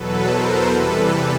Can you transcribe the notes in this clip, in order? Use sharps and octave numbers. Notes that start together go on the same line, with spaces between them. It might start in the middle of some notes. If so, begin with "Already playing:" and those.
Already playing: E2 B2 F#3 A4 B4
A#4 C5
E2 C3 E3 G3 A4 B4